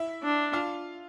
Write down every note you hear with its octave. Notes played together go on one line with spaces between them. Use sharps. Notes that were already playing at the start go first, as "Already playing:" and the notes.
Already playing: E4 E5
D4
F4 F5